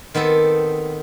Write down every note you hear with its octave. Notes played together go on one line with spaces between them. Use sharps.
D#3 B3 C4 A4